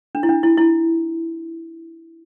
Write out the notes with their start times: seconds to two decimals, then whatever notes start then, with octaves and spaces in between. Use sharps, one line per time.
0.15 D4
0.23 E4
0.29 D4
0.43 E4
0.58 E4